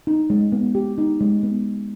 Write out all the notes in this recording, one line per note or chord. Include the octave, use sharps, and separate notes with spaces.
D#4
G#3
B3
G4
D#4
G#3
B3